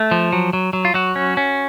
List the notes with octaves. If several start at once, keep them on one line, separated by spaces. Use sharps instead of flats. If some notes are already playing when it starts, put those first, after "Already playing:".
Already playing: A3
F3
F#3
F#3
F#3
F4
F#3 F#4
C#4
C#4